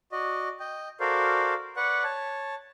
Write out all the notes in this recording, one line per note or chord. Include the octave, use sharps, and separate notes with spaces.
F#4 D5 D#5
D#5 G5
F#4 A4 A#4 C5 D5 F5
B4 D5 F#5 C#6
C#5 A5